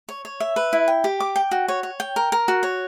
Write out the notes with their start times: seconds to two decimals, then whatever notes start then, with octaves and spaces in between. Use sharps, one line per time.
0.09 C#5
0.25 C#5
0.40 E5
0.56 B4
0.73 E4
0.88 G5
1.04 G4
1.20 D6
1.36 G5
1.51 F#4
1.68 C#5
1.83 C#5
2.00 G5
2.16 A#4
2.32 A#4
2.48 F#4
2.63 C#5